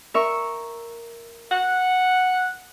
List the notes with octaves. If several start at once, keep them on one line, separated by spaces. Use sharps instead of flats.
A#4 E5 C#6
F#5